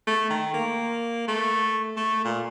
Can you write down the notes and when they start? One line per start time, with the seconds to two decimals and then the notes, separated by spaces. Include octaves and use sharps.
0.07 A3
0.30 D#3
0.54 A#3
1.28 A3
1.96 A3
2.25 A#2